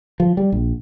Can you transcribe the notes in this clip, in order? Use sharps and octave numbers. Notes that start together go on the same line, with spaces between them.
F3
G3
A#1